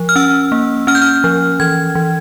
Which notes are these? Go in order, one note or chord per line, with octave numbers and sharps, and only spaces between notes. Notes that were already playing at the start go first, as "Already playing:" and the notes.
Already playing: F3
F6
C#4 E6
A#3
C#4 F6
G6
F6
F3
E3 G#6
E3